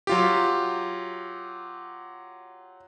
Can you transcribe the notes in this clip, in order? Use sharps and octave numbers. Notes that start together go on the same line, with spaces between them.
F#3 F4 G4